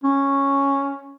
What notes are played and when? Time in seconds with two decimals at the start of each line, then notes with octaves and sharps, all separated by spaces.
0.03 C#4